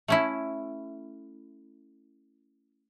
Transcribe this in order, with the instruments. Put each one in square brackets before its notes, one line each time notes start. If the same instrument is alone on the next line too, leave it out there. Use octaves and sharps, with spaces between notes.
[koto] A3 C#4 E4